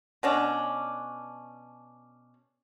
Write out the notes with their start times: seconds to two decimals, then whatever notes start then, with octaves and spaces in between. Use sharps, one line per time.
0.23 B2 C#4 D4